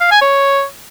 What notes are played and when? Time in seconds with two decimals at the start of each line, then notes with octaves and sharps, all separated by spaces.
0.01 F5
0.11 G#5
0.21 C#5